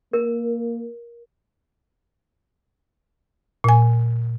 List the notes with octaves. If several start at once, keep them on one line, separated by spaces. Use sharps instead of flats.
A#3 A#4
A#2 G#5